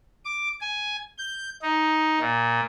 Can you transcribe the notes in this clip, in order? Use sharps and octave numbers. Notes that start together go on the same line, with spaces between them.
D6
G#5
G6
D#4
A#2